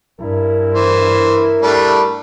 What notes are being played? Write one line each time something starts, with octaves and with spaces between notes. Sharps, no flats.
G2 E4 A#4
E3 C5
G3 A3 D4